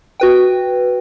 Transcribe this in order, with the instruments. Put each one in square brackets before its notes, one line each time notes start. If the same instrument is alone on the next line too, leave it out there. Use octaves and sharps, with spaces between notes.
[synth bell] F#4 B4 G5